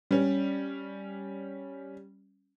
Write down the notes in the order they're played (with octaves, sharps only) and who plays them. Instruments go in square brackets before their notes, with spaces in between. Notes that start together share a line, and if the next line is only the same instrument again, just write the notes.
[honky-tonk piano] G3 C#4